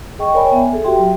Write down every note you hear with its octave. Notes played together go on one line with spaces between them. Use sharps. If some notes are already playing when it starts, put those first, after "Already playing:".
G#4 D#5 G5 C#6
A#4 C#5 D5 G5 G#5 B5
B3 E5 G#5
G#4 A4
F#4 G4 E5 G5 C6
F#3